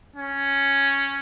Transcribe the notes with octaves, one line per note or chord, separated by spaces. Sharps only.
C#4